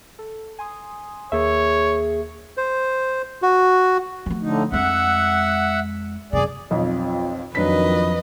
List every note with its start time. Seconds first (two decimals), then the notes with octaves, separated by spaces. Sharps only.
0.19 A4
0.59 G#5 C6 D#6
1.32 D#2 A#3 G#4 C#5 E5
2.57 C5
3.42 F#4
4.26 F3 A3
4.42 A2 D3 D#4
4.72 F2 G#3 E5 F#5
6.33 F#2 C3 G#4 D5
6.71 B1 F2 C4 F4
7.55 F2 D#3 F3 F#3 D4 B4 D#5 B6